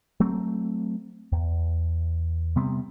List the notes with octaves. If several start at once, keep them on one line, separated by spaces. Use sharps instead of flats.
F#3 A3 C4
E2
C3 G3 B3 C4